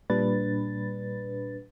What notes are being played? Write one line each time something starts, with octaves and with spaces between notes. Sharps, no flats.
A#2 G3 D4 B4 A6